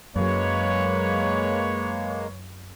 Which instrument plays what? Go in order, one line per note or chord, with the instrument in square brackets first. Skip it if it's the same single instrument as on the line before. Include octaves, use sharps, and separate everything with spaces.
[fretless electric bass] F#2 F#3 [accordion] G#3 A#3 [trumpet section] B4 C#5